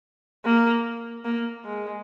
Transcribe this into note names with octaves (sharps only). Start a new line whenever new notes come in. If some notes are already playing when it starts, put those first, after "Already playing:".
A#3
A#3
G#3